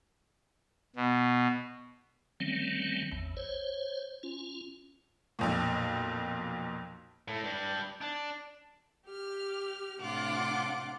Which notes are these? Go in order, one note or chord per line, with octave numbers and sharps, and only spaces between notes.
B2
D#3 F#3 G3 A3 C4 C#4
A1 E2
C5 C#5
C#4 F4
B1 F2 A#2
A2
G3 D4
D4
G4 F6
A2 C3 D4 F4 F#5 D6